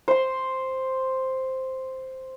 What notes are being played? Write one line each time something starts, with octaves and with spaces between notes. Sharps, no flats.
C5 C6